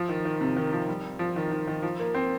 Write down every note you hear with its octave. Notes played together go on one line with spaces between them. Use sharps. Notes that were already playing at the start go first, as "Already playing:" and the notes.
Already playing: F3
D#3
D#3
C3
D#3
F3
G3
F3
D#3
D#3
D#3
F3
A#3
C4